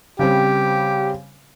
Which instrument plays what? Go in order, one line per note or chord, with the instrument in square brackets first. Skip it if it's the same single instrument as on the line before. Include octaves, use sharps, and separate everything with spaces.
[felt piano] C#3 G3 C4 [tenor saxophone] G4